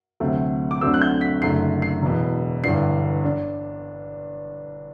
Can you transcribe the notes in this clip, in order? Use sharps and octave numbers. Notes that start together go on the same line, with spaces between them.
D2 C3 F#3 A3 C4
D6
D2 D3 F#3 A3 C4 E6
F#6
G6
B6
F#1 F#2 D3 A3 C7
C7
E1 E2 B2
G1 G2 E3 B3 D4 C7
D4